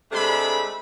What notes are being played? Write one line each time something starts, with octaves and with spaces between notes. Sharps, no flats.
C3 G#3 A3 D4 B5